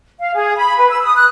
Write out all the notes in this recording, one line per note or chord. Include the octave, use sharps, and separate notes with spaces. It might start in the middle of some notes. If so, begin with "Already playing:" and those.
F5
G#4
B5
B4
E6
D#6
F#6